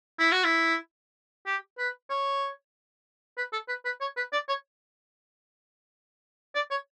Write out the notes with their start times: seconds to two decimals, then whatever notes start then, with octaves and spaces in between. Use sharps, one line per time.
0.19 E4
0.32 F#4
0.44 E4
1.46 G4
1.78 B4
2.10 C#5
3.37 B4
3.53 A4
3.68 B4
3.85 B4
4.01 C#5
4.16 B4
4.32 D5
4.48 C#5
6.55 D5
6.71 C#5